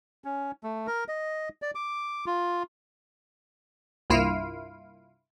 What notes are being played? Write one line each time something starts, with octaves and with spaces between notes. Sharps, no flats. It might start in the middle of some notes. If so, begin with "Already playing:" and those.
C#4
A3
A#4
D#5
D5
D6
F4
C2 G2 A#3 E4 F4 F5